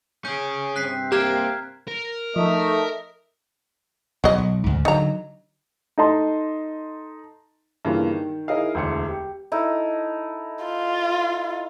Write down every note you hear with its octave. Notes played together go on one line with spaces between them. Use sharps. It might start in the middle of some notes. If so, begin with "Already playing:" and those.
C#4 G#4 G6
G2 C3 C4 F#6 B6 C7
A#3 G4 A#5 F6 G#6
A#4
F3 A3 D#4 D#5 E5
B1 F#3 D#5
B1
D2 G#2 C#3
D3 F#3 D#4 A#5
D#4 A4 D#5 A5 C6
G2 C#3 E3 A#3 F4
D#3
D#4 E4 G#4 A#4 D#5 F5
E1 D2 C#7
G4
D#4 E4 A4
F4